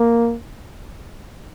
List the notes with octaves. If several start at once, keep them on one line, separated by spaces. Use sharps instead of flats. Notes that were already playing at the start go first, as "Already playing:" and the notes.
Already playing: A#3